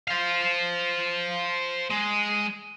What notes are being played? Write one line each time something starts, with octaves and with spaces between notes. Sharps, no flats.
C5 F5
G#3